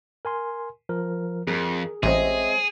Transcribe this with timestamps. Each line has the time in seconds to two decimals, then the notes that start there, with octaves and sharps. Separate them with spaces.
0.25 A#4 G#5 C6
0.89 F3 A#4
1.47 F2 G#4 A#4
2.03 A1 G#3 C4 G#4 C#5 D#5 E5